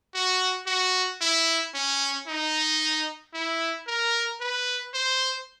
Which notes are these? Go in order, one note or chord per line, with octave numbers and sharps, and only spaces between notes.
F#4
F#4
E4
C#4
D#4
E4
A#4
B4
C5